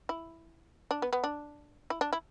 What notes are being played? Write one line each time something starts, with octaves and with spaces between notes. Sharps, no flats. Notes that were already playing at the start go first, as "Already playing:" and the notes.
E4
D4
B3
B3
D4
E4
D4
E4